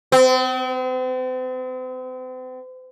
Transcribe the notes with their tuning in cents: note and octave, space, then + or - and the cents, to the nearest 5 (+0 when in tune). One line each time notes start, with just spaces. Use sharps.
C4 -40